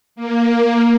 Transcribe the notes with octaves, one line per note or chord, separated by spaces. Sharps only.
A#3